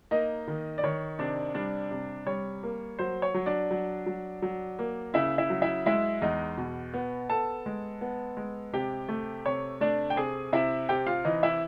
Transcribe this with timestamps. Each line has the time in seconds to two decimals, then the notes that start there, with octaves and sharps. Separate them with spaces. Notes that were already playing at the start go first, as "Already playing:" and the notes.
0.11 A#3 D#4 D#5
0.48 D#3
0.78 D5
0.83 D#3 C#5
1.19 C3 D4 D5
1.55 G3 D4 D5
1.91 C3
2.26 G3 C#5
2.63 A#3
2.99 F#3 C5
3.22 C#5
3.34 F#3
3.46 D4 D5
3.71 F#3
4.06 F#3
4.42 F#3
4.79 A#3
5.14 C#3 E4 E5
5.38 E4 E5
5.50 F#3
5.62 E4 E5
5.86 G#3 E4 E5
6.22 E2 D#4 D#5
6.58 B2
6.94 B3
7.30 B3 A4 A5
7.66 G#3
8.01 B3
8.37 G#3
8.74 C3 G4 G5
9.09 A3
9.46 C3 C#5
9.81 A3 D4 D5
10.10 G5
10.16 C3 G#4 G#5
10.53 C3 E4 E5
10.89 C3 G4 G5
11.07 F4 F5
11.25 E3 D#4 D#5
11.43 E4 E5